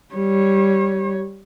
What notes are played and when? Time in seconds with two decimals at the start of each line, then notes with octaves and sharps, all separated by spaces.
0.14 G3 C#5